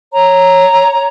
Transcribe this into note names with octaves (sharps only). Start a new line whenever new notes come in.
C#5 A#5